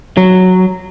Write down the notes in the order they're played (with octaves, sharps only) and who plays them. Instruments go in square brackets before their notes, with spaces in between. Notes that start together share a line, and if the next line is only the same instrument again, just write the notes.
[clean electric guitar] F#3